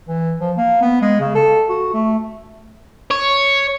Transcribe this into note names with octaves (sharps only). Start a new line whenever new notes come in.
E3
F3
A#3
B3
G#3
C#3
A4
F#4
A3
C#5